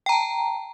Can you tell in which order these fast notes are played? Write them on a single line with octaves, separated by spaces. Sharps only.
G5 A#5 A5